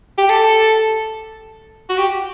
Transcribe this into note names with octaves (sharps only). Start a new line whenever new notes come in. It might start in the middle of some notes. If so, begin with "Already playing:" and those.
G4
A4
F#4
G4